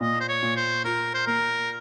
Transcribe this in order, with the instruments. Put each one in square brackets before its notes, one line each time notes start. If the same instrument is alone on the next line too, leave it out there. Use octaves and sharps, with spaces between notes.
[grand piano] A#2 [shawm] D#5
[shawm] C5
C#5
[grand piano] A#2
[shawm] C5
[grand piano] F4 [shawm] A#4
[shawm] C5
[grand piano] A#3 [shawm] A#4